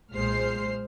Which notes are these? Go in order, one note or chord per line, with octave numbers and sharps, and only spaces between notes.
B1 A#2 G#3 C5 F6 C7